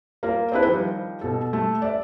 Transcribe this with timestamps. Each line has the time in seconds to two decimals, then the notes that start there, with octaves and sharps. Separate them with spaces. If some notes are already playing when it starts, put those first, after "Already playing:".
0.23 A#3 F4 A#4
0.52 C4 D4 E4 G#4 B4 C5
0.67 D#3 F3 G3
1.21 B2 A4
1.53 A3
1.82 D5 E5